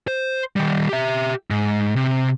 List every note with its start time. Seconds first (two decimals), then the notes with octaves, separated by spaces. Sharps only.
0.08 C5
0.56 D#3 G3
0.89 G4 E5
1.50 G#2
1.96 C3